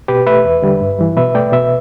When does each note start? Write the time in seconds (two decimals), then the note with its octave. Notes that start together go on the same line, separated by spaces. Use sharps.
0.08 B2 G4 B4
0.26 A3 B4 E5
0.44 E2
0.62 D3 G3
0.81 G2
0.99 E3 G3
1.17 B2 B4 E5
1.35 A3 D5 G5
1.53 B2 B4 E5